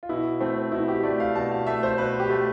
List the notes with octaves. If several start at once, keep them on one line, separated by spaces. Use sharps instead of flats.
F4
B2 E4
A3 C4
B2 E4
G4
A3 D5
F5
B2 A5
F5
A3 E5
C5
B2 B4
G4
A3